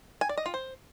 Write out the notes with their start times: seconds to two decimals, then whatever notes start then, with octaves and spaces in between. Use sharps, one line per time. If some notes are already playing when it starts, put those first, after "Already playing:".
0.21 G#5
0.29 D5
0.38 D#5
0.46 F4
0.54 C5